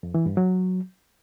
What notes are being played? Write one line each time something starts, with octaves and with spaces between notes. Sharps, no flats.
F2
E3
G2
F#3